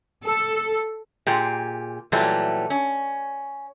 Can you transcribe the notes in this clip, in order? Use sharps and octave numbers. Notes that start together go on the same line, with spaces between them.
A4
A#2 G4 G#4
A#2 E3 F#3 G3 A3
C#4